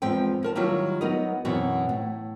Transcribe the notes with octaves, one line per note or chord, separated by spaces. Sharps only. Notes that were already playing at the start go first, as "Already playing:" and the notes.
E2 G#2 F3 C4 G5
E2 A#4 A5
D#3 F#3 G3 E4 F4
F#3 B3 D#4 A#4 D#5
F#2 B2 E3 C4 F#4
A2